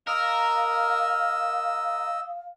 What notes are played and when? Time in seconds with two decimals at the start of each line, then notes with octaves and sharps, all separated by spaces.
0.07 A#4 D#5 F5 E6